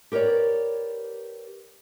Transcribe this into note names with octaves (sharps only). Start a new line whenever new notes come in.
G4 A#4 B4 C#5 D5